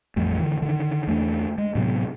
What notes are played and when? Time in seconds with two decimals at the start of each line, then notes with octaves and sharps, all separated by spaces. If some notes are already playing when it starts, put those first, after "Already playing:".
0.16 A1 F2 G3 A3
0.39 D3 E3
0.62 D3 D#3
1.07 E2 A3 B3 D4
1.58 G#3
1.75 A2 C3 F#3 B3